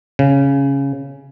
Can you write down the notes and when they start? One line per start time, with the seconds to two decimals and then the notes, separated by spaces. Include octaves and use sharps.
0.19 C#3